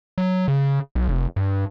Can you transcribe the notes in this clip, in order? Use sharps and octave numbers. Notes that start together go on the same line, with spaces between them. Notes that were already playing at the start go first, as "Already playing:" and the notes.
F#3
C#3
B1
F1
G2